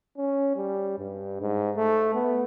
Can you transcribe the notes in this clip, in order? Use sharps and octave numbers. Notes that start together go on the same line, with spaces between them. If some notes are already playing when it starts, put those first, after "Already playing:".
C#4
G3
G2
G#2
A3
B3